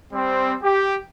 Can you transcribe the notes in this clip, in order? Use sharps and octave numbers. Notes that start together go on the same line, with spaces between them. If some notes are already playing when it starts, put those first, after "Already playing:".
G3 C4
G4